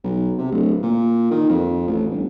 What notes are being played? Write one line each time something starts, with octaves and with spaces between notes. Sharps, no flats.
B1
C3
D1
A#2
D#3
F2
A1
G1